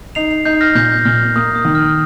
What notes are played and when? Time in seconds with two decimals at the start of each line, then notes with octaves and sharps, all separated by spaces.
0.15 D#4 C7 F7
0.31 C7 F7
0.45 D#4 G6 C7
0.61 F6 A#6
0.75 A#2 G6
1.05 A#2 F6
1.36 A#3 D#6
1.55 D#6
1.65 D#3
1.75 F6